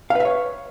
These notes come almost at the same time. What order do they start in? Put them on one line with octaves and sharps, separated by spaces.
F5 B4 E5 C#5